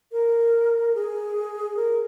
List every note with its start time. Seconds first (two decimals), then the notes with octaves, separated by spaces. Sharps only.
0.12 A#4
0.95 G#4
1.76 A#4